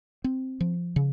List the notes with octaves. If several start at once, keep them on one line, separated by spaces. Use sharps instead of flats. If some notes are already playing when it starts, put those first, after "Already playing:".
C4
F3
C#3